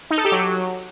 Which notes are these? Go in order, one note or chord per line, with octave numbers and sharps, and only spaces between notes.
D#4
A4
G4
F#3